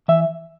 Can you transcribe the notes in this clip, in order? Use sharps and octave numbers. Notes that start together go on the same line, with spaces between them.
E3 E5